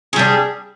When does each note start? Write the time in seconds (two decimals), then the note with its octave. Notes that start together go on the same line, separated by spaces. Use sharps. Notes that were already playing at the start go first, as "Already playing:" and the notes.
0.13 G#4
0.16 G3
0.19 D4